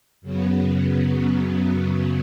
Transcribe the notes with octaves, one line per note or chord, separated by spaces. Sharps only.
F#2 C#3 F#3 B3